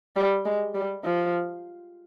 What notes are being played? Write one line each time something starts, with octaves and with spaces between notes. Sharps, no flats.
G3
G#3
G3
F3